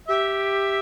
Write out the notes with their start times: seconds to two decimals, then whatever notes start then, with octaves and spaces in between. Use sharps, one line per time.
0.08 G4 E5